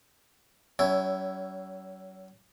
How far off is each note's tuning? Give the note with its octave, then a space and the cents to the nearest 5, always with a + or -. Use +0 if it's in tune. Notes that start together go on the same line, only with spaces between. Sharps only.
F#3 +40 C#4 +20 E4 +0